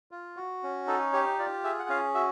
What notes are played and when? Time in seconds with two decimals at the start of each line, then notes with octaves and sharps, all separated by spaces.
0.11 F4
0.37 F#4
0.63 C#4
0.87 D#4 A4
1.13 G4 C#5
1.39 F4 D5
1.64 G#4 E5
1.79 F#5
1.89 C#4 F5
2.14 F#4 E5